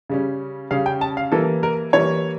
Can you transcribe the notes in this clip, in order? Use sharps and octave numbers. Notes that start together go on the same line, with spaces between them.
C#3 G3 C#4
C#3 G3 C#4 F5
G5
A5
F5
E3 G3 A#3 A4
A#4
E3 G3 A#3 C#5